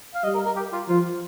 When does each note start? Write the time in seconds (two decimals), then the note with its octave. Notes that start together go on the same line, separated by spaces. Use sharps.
0.15 F5
0.24 G3 D#5
0.35 A#4
0.46 A#4
0.56 G4
0.73 F4
0.88 F3 F4